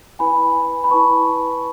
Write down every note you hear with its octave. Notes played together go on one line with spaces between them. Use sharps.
E4 B4 G#5 B5
B5
E4 B4 A5 C#6